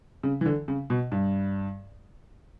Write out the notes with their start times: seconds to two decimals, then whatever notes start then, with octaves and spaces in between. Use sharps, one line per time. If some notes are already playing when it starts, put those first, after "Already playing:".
0.23 C#3
0.41 E3
0.46 D3
0.68 C#3
0.90 B2
1.12 G2